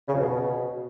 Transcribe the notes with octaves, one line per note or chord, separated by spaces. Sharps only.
C#3
F2
B2